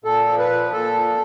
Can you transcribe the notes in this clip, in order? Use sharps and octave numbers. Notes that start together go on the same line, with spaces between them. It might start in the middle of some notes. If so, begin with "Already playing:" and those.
A#2 A4
F3
B4
A#2
A#2 A4
F3